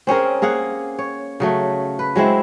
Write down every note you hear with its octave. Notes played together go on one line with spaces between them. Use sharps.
C4 C#4 G#4 A#4
A#3 G#4 F5 F#5
C#5
C#3 F#3 A3
B4
F#3 G#3 C4 E4